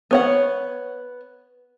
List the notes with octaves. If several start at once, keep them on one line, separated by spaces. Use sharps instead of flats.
B3 C#5 F#5